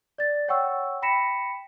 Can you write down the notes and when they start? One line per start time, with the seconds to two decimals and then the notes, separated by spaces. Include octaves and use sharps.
0.18 D5 A6
0.48 C#5 F#5 G5 C#6 E6
1.02 G5 B5 A#6 B6 C#7 E7